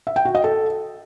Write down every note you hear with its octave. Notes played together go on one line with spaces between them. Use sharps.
E5
G5
F#4
D#5
A4